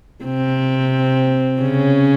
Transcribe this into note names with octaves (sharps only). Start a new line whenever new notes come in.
C3 C4
C#3 C#4